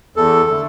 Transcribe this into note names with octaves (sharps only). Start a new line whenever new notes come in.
E2 A4
D3 A3